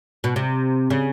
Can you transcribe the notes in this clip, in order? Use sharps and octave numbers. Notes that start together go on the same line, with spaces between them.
B2
C3
C#3